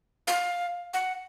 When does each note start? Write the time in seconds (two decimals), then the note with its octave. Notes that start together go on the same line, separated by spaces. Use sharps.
0.27 F5
0.94 F#5